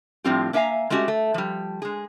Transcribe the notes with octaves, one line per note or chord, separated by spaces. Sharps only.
A2 F3 G3 C4 F4 G4
A#3 D4 E5 F5 G#5 A#5
G#3 A3 C#4 F#4 G4
A3
F3 G3
G#3 G#4